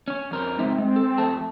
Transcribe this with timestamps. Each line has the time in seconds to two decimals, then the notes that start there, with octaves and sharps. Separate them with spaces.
0.08 C#4 C#5
0.31 F2 A#4 C5
0.59 G#3 C4 D#4 E5
0.78 G#3
0.96 A4
1.18 F2 A3 A5